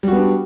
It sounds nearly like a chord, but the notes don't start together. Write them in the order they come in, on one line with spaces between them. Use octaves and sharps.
G3 F#4 B3 D4